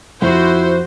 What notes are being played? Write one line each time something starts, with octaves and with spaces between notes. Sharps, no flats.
F2 E4 F#4 C5